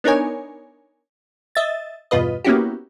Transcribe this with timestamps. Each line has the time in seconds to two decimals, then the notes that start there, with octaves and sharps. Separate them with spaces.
0.04 B3 D4 D#4 A#4 C#5 G#5
1.55 D#5 E5 A6
2.11 E2 G2 B2 F4 B4 D#5
2.44 A#3 B3 C#4 E4 F#4 G4